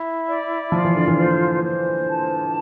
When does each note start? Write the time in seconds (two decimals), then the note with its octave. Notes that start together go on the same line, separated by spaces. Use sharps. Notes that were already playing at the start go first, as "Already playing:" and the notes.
Already playing: E4
0.27 D5
0.72 F3 F4
0.85 E3
0.96 D3
1.08 E3
1.18 C5
1.63 C5
2.08 A5